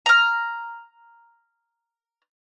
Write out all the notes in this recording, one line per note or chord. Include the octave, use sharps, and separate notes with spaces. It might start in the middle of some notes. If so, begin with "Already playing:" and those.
A#5 F6